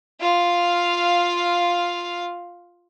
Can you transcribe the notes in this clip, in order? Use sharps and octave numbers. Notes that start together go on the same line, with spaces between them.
F4 F5